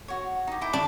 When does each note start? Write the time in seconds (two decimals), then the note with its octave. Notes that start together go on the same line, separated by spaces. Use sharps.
0.08 F#4 C#5
0.47 D#4 G4
0.61 E4 G5 D6
0.73 D4